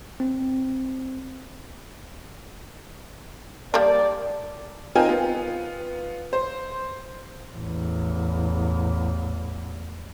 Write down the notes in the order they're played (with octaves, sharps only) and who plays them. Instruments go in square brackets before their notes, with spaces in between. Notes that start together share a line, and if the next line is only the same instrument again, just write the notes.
[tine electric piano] C4
[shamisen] G3 A#3 D4 [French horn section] D5
[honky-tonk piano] C4 D#4 F4 A#4 G5 G#5
B3 F4
C5
[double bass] A1 E2